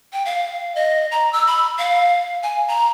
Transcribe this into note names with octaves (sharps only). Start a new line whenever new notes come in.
G5
F5
D#5
A#5
E6
B5
F5
G#5
A#5